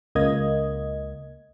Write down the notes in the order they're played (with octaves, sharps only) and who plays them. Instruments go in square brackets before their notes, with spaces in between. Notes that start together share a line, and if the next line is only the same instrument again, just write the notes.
[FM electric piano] C#2 A#3 D#5 G#6